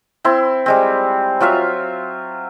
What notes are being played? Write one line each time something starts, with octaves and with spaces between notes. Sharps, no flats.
C4 E4 C6
G3 G#3 C4
F#3 F4 E5 F5